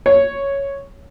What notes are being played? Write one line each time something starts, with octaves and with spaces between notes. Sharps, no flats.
C#5